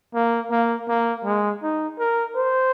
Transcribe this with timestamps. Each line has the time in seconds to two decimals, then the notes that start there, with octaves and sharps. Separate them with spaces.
0.15 A#3
0.51 A#3
0.88 A#3
1.25 G#3
1.62 D#4
1.99 A#4
2.36 C5